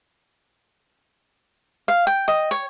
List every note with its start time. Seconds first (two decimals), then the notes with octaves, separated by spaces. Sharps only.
1.88 F5
2.07 G5
2.28 D#5
2.51 C#5